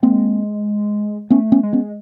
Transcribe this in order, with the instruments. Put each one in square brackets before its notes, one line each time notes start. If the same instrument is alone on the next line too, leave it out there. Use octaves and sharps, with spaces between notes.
[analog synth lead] G#3 [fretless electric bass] A#3 C4
[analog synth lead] A3 [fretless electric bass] B3 C#4
[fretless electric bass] B3 C#4
[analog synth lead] G#3
[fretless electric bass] B3 C#4